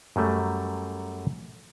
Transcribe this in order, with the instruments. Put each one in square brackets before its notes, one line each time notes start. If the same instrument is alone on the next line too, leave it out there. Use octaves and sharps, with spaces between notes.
[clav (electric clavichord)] F#2 F#3 G3 A3